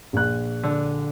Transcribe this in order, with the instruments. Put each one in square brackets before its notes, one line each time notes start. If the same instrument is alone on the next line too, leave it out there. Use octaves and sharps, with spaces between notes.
[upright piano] A#1 F#6
[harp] D3